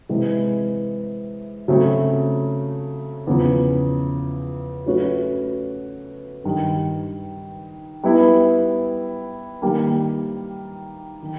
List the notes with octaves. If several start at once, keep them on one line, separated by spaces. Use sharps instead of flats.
C3 E3 G#3
C#3 F#3 A3 C4
E2 C#3 F3
F#3 A3 C#4 F#4 B4
G2 D#3 G3
G3 B3 E4
D#3 G3 A#3
D#3